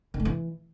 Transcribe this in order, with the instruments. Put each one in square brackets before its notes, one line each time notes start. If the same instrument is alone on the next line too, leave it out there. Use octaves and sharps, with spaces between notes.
[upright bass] D#3
A3
E3